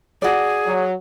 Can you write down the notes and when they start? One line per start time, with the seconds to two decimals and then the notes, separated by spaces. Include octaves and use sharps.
0.22 F#4 G#4 D5
0.67 F#3